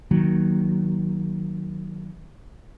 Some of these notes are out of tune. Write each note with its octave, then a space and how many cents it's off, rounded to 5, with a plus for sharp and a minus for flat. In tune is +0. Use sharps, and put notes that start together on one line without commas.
D#3 +0 F#3 +0 A#3 +0